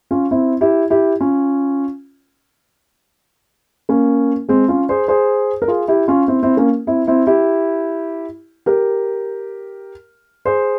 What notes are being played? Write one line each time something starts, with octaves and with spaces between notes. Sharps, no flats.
C#4 F4
C4 E4
E4 G4
E4 G4
C#4 F4
A#3 C#4
G#3 C4
C#4 F4
G#4 C5
G#4 C5
A#4
F4 G#4
E4 G4
C#4 F4
C4 E4
C4 E4
A#3 C#4
C4 E4
C4 E4
E4 G4
G4 A#4
G#4 C5